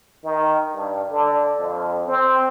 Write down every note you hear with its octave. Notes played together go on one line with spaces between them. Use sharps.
D#3
G2
D3
F2
C4